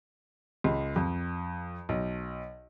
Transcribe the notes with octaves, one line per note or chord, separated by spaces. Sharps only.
C#2
F2
B1